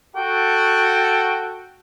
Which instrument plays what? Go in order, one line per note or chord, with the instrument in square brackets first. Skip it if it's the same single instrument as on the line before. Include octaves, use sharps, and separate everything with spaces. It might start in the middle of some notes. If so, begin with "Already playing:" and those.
[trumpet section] F#4 A4 [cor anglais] G5